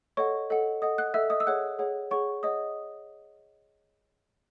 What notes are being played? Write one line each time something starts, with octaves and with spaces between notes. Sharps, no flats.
A4 C#5 D#5 F#5 C#6
A4 D#5 F#5
A4 D#5 F#5 D#6
F#5 F#6
A4 D#5 E5 F#5 E6
D#5 D#6
E6
G#4 C#5 F#5 F#6
G#4 C#5 F#5
G#4 C#5 F#5 C#6
G#4 C#5 D#5 F#5 D#6